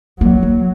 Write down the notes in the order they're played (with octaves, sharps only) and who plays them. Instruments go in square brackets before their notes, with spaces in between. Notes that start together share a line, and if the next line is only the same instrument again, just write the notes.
[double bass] F#3 [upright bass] A#3
[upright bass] A#3